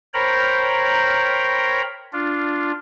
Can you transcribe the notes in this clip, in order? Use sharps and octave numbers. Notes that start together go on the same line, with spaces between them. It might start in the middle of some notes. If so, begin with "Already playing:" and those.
A#4 C5 C#5 G5 A#5 B5
D4 F4